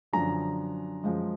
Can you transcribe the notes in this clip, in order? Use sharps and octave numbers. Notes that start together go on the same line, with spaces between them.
F#2 D3 F3 A#5
F#2 F3 G#3